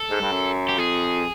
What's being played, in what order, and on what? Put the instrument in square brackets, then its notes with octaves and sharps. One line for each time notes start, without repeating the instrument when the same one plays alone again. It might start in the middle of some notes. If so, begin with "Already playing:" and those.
Already playing: [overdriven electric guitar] A4
[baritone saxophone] G#2
G2
F#2
[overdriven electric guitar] G4
[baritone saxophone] F2 [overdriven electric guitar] G#4